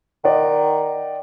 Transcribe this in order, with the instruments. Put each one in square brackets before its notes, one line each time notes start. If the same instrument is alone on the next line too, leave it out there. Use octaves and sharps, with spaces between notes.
[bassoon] D#3 [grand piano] D5 D#5 F#5